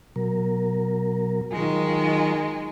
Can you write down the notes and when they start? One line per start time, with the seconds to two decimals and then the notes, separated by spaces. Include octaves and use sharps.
0.16 B2 F#3 A#4
1.52 D#3 F#3 G#3 F4